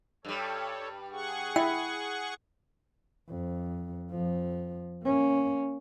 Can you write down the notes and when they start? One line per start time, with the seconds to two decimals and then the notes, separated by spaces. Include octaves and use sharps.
0.25 G2 G3 A4 C#5
1.12 G#4 F#5 C#6
1.56 E4 G5
3.29 F2
4.12 F2 F3
5.04 A#3 C#4